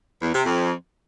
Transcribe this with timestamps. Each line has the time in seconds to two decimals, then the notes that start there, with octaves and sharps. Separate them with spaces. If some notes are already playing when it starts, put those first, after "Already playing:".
0.22 E2
0.33 C3
0.45 F2